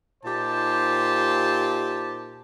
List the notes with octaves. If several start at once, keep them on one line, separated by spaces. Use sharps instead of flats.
A#2 D#4 G4 C5 A5